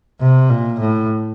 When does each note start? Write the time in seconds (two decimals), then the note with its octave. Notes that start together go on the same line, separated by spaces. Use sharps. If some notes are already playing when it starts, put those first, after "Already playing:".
0.20 C3
0.49 A#2
0.80 A2